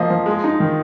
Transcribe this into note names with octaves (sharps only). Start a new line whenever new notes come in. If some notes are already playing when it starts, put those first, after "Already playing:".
Already playing: F3 A#3 D#5 F5
F3
G#3
D#4
D#3